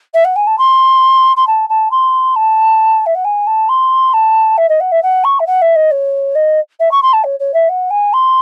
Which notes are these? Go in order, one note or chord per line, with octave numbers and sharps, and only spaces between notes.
E5
F#5
G#5
A5
C6
C6
A5
A5
C6
A5
E5
F#5
G#5
A5
C6
A5
E5
D#5
F#5
E5
F#5
C#6
E5
F#5
E5
D#5
C#5
D#5
E5
C#6
C6
A5
C#5
C#5
E5
F#5
G#5
C6